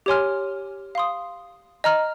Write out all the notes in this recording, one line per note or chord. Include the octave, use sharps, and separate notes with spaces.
G4 C#5 G#5 C6 F6
F5 C6 D#6
D#5 A#5 F6